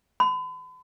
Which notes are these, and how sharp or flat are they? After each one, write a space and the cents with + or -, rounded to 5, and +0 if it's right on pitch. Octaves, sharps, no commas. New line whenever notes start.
B5 +40